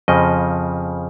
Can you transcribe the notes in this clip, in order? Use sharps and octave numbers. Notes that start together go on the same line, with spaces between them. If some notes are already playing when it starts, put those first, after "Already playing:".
F2 C#3 F3 D#5